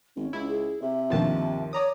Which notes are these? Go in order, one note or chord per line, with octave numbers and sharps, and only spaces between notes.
G#1 C#4
C#2 E4
G#4
C3 E5
G1 D#2 B2 F3 A5
C#5 D5 A#5 D#6